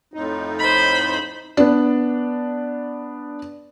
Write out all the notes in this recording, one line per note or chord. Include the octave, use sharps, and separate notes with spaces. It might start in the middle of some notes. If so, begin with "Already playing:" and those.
F2 A2 D#4
C5 B5
B3 D4